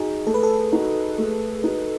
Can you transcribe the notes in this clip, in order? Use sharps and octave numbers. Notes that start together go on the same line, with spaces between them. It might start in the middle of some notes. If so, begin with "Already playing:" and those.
Already playing: D#4 F#4 G#4
A3 A4
B4
A4
D#4 F#4
A3
D#4 F#4